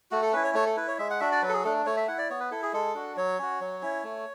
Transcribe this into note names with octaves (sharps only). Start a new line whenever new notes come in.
A3 F#4
A4
C#4 E4 B4
C#5
A3 C#5
A4
E4 B4
C#5
G#3 E5
F#5
D4 F#4 E5
D5
F#3 B4
A4
G#4
A3 D4 A4
A3 C#5
E5
E4 F#5
D5
B3 C#5
B4
E4 A4
G#4
G#3 A4
D4 F#4
F#3 C#5
C#4 F#4
F#3
C#4 E4
A3